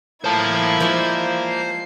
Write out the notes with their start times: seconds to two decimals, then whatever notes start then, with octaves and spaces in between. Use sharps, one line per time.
0.24 A2 A#3 E4 F4 C5 A5 G#6
0.80 F3 G3 G#3 A#3
1.49 C7